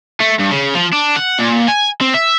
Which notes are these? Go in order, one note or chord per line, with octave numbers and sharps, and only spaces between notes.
A3
G2
C#3
F3
D4
F#5
A#2
G#5
C4
E5